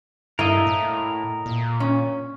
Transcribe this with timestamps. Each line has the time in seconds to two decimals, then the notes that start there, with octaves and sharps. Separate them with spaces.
0.39 G2 A3 A#3 E4 A#4 D#5
0.67 A2
1.46 A#2
1.80 C#4